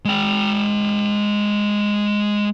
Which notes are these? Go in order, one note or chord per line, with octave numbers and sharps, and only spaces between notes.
G#3 G5